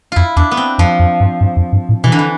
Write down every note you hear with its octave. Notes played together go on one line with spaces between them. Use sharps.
F2 E4 F4
E2 D4
B3
C4
F2 F3
F2
G2
G2
F2
G2
A2
B2 E3
D3
E3